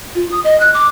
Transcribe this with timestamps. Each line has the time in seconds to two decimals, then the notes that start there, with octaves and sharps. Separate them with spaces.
0.15 F4
0.32 D#6
0.44 D#5
0.60 F#6
0.74 D6